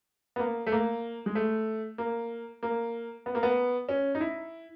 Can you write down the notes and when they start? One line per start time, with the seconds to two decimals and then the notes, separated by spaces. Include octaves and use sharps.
0.36 B3
0.39 A#3
0.67 A3
0.72 A#3
1.26 G#3
1.35 A3
1.98 A#3
2.63 A#3
3.26 B3
3.35 A#3
3.43 B3
3.89 C#4
4.15 D#4
4.21 E4